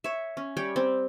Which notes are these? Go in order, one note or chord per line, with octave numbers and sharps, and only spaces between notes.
C#5 E5
C#4
G3 C#5 G5
C4